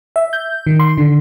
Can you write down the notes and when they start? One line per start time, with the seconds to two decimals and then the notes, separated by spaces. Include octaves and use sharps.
0.16 E5
0.33 G6
0.67 D#3
0.79 C6
0.98 D3